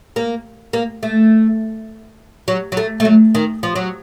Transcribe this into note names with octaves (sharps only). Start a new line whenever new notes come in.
A#3
A#3
A3
F#3
F#3
A3
A3
F#3
D#3
F3
F#3